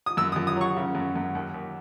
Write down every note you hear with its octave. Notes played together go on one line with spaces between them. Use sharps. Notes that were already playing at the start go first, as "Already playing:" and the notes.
D#6
F#2 E6
F#2 D#6
D#6
F#3 C#6
C#3
F#2
F#2
D#2
D#2